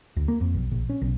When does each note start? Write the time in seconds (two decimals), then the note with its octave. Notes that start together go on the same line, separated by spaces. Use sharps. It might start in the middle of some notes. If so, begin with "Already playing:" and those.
0.17 D2
0.28 A#3
0.41 F2
0.54 B1
0.71 A#1
0.89 C#4
1.02 B1